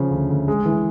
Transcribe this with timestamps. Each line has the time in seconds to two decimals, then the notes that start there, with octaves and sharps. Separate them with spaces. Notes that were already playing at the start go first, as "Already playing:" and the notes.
Already playing: C#3 F3
0.11 D2
0.29 D2
0.48 G#3
0.65 E3